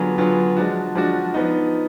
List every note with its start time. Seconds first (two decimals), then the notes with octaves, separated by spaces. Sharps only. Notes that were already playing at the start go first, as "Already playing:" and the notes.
Already playing: D3 F#3 B3 F4 G#4
0.18 D3 F#3 B3 F4 G#4
0.56 F3 G#3 D4 F#4
0.95 F3 G#3 D4 F#4
1.34 F3 B3 D#4